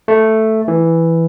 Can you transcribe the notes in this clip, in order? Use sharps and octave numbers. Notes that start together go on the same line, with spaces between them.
A3
E3